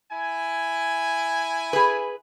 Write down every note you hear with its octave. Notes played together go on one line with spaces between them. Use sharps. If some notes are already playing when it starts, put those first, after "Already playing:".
E4 G#5
G#4 B4